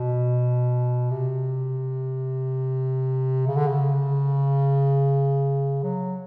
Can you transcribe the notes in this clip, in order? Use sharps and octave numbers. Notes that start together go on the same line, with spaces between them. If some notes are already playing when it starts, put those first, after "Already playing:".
Already playing: B2
C3
C#3
D3
C#3
F#3